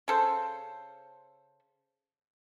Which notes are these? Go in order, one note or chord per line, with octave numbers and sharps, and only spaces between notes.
C#3 A4 C5